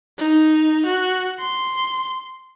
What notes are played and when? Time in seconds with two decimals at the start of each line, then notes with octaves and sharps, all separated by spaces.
0.18 D#4
0.85 F#4
1.39 C6